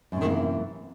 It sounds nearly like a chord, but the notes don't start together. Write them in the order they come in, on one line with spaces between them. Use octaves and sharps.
F#2 C3 D#3 A#3 E3